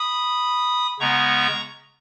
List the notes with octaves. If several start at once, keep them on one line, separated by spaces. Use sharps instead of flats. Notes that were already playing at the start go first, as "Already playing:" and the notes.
Already playing: B5 D#6
C#3 G#3 B3 A#5 C#6